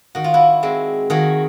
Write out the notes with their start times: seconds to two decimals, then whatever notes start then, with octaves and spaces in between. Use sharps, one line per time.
0.15 D#3 F#4
0.24 F4
0.34 E4 F#4
0.63 G#3 C4
1.10 D#3 F#4 G#4